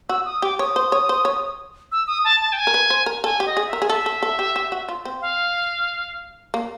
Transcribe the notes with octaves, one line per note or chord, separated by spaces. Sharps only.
F#4 E6
D#6
G4 D6
C#5 D#6
C5
C#5
C5
C#5
E6
D#6
A5
A5
G5
G#5
A#4
B4
C5
A#4
A4 G#5
G4
D#5
G#4
E5
A#4
G#4
A4 E5
A4
A4
G4
G4
F#4
F4
C4
F5
A#3